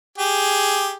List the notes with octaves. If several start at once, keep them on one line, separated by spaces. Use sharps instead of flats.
G4 G#4